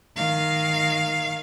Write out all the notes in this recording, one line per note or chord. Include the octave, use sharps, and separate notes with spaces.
D#3 F5